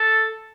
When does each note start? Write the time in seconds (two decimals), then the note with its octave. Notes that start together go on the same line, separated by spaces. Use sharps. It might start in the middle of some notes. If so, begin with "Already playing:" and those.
Already playing: A4